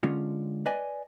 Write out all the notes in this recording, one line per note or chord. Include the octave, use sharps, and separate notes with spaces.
D3 G#3 C#4 F4
B4 D5 D#5 G#5